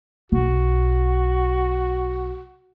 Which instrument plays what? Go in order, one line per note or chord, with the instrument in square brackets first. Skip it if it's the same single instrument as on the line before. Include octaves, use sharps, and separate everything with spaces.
[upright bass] B1 [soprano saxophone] F#4